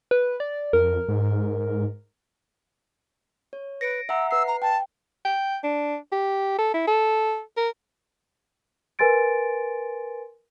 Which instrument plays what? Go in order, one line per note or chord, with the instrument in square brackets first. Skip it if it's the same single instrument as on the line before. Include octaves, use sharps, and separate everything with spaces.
[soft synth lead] B4
D5
[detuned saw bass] F2 [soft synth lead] A#4
[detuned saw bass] G#2
[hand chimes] C#5
[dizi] B4 [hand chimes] A#6 C#7 D7
[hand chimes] E5 F#5 A#5 [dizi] E6
[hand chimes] B4 C7 [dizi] E6
[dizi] A#5
[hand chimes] G5 [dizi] A5
[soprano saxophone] G5
D4
G4
A4
E4
A4
A#4
[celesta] A#4 B4 G#5 C6 A6 D7